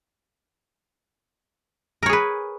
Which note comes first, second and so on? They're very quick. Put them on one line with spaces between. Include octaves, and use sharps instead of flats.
A#4 C#5 G#4 B4